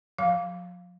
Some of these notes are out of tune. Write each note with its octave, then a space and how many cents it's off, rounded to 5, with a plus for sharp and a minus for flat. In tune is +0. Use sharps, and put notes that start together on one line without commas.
F3 +45 F5 +0